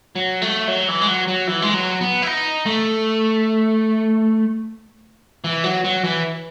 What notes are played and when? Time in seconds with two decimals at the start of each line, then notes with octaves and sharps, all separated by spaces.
0.16 F#3
0.42 A3
0.68 F#3
0.88 E3
1.01 G#3
1.07 F#3
1.28 F#3
1.47 E3
1.62 G#3
1.74 F#3
2.01 B3
2.22 E4
2.27 D#4
2.66 A3
5.44 E3
5.64 F#3
5.84 F#3
6.04 E3